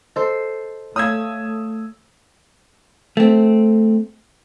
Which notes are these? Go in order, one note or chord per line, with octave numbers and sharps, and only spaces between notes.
A4 C5 D#5
A3 C#5 F5 D#6 E6 G#6
A3 C4